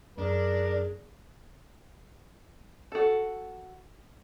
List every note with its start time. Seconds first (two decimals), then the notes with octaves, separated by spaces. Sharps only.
0.18 F#2 D4 G#4 A#4
2.92 F#4 A4